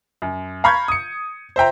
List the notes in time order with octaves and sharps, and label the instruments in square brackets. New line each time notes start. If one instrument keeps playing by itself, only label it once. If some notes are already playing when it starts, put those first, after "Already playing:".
[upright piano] F#2
F5 A#5 B5 C#6 G6 G#6
D#6 C#7
C5 E5 G5 A#5